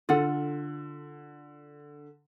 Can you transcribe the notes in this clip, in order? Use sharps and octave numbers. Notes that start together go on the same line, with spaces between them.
D3 F4 A4 F#5